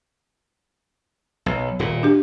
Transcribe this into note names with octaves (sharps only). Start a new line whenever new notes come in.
B1
D#1 A#2
D4 G4